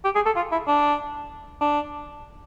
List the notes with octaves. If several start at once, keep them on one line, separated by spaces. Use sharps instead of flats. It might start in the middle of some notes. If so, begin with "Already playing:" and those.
G4
G#4
A4
F4
E4
D4
D4